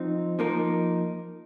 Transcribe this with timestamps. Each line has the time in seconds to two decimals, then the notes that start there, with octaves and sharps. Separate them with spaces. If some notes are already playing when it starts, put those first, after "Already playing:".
Already playing: F3 C4 D#4
0.39 F3 A#3 D#4 A#4